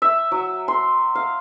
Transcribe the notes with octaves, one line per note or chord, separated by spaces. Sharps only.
E5
F#3
C6
F5